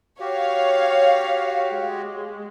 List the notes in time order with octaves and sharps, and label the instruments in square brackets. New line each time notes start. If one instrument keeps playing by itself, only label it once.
[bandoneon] F#4 G4 [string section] C#5 F5
[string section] G#3